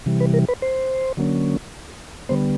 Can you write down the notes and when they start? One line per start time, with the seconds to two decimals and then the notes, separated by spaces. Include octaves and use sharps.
0.06 C3 E3 G3
0.21 B4
0.34 A#4
0.49 B4
0.62 C5
1.17 D3 F#3 A#3 C#4
2.29 D3 G3 B3 C5